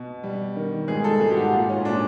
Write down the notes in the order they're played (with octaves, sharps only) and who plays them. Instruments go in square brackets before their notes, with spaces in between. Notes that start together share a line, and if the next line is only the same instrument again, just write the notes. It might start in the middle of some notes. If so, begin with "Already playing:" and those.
Already playing: [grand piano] B2
G3
D#3
[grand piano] G#2 [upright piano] G#4
[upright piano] A4
[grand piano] G#2 [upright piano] G#4
[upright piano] G4
F#4
[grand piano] A#2 [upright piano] F4
[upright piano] C#4
[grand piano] A#2 [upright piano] D4